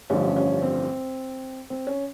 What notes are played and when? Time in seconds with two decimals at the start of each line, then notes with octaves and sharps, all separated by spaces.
0.10 A1 G2 D3 F3 C#4
0.36 C#4
0.62 C4
1.70 C4
1.87 C#4